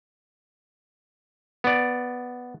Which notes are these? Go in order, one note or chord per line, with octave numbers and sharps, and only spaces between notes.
B3 D5